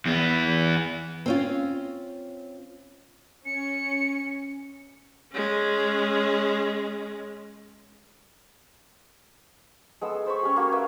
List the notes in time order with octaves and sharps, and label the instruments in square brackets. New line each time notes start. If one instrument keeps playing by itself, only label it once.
[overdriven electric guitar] E2 B3
[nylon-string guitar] C4 C#4 F4
[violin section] C#4 [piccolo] C#7
[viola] G#3 C#4
[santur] G#3 B3 A4 E6
C5 B5 C#6
C#4 G4
A#3 F#4 A4
A#3 B4 E5 F5